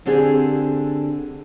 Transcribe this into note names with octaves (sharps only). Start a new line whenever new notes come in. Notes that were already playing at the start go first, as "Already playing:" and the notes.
D3 C4 D4 G4 G#4